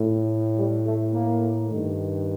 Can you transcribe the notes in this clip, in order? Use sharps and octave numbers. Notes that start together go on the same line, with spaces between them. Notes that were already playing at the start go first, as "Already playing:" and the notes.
Already playing: A2
G3
A3
A#3
G2 D#3